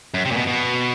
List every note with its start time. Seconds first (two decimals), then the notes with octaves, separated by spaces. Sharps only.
0.14 F#2
0.25 C3
0.31 A#2
0.36 B2
0.47 B2